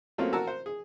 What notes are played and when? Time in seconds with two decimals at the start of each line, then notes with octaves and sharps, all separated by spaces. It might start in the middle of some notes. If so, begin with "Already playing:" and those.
0.18 F#3 A3 A#3 C4 C#4 F4
0.33 F#4 A#4 A5 A#5 E6
0.47 C5
0.66 G#4